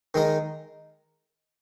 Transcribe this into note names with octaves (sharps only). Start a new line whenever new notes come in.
D#3 G#3 D#4 A#4